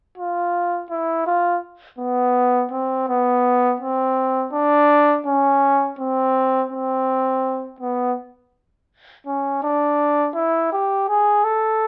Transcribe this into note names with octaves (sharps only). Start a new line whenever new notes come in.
F4
E4
F4
B3
C4
B3
C4
D4
C#4
C4
C4
B3
C#4
D4
E4
G4
G#4
A4